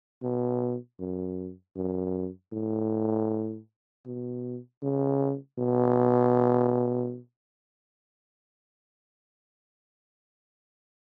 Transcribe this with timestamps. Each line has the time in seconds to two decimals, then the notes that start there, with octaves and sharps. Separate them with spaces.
0.23 B2
0.99 F#2
1.76 F#2
2.52 A2
4.06 B2
4.82 C#3
5.59 B2